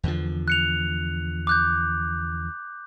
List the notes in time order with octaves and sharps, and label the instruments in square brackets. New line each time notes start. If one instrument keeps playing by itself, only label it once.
[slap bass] E2 D3 F3
[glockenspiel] F#6 C#7 F7
D6 F#6 G6